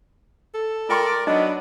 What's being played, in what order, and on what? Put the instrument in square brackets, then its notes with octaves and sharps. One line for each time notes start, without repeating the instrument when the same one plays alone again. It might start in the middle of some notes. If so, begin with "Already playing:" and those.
[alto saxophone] A4
[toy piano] F4 G5 C6 [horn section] A#4 D5
[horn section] F#3 B3 [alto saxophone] D4 [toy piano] D#4 D#5